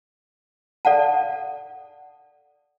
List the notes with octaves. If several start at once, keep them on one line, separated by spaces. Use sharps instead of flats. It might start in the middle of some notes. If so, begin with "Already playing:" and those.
A4 D5 F5 F#5 A5